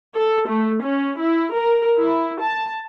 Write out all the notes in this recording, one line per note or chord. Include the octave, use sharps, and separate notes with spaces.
A4
A3
C#4
E4
A#4
E4
A5